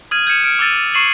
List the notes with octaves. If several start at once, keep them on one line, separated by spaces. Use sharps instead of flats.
D#6 F6 G#6 D#7
G6 G#6 C#7 E7
F6 D7
D6 E6 A6 D#7
C#6 C7 D#7 F#7